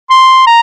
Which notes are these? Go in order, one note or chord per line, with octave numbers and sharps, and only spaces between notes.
C6
A#5